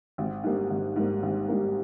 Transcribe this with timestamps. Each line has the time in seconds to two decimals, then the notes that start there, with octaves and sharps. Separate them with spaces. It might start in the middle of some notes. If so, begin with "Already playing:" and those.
0.18 G#1
0.43 G#2 G3 A#3
0.70 G#1
0.96 G#2 G3 A#3
1.23 G#1
1.48 G#2 G3 A#3